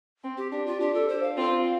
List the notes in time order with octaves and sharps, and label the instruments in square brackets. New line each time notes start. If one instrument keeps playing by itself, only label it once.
[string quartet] C4
[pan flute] G4
[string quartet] D4 [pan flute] G4
[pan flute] F4
[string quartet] D4 [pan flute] G4
[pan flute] A4
C5
F5
[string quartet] C4 F4